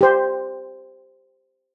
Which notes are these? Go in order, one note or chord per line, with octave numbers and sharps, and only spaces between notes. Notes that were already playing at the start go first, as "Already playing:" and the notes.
G4 C5